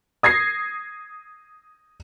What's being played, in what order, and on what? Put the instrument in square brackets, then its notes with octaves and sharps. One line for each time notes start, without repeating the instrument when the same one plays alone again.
[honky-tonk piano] D#6 G#6 A#6 C7